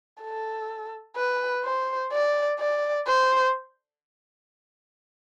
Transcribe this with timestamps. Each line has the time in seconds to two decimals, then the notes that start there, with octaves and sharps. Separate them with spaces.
0.22 A4
1.16 B4
1.64 C5
2.12 D5
2.59 D5
3.07 C5